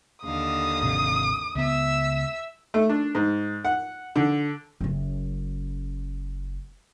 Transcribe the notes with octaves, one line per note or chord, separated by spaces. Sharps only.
D#2 D3 F5 D#6
G#1 C3
C#2 B3 E5 E6
A3
D4
G#2
F#5
D3
F#1 C#4